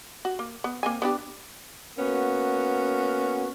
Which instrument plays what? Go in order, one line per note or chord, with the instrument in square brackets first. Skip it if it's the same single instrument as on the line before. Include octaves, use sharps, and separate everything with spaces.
[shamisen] F#4
A#3
B3
A#3 C4 G#5
B3 D4 G4
[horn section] A#3 B3 C#4 F#4